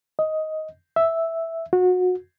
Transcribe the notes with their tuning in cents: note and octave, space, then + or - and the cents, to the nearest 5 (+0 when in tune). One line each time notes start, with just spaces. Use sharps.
D#5 +10
E5 -5
F#4 -25